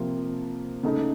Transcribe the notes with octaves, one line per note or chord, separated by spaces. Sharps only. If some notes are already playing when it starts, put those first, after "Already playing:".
Already playing: C3 F3 A#3 F4
C#3 A3 D#4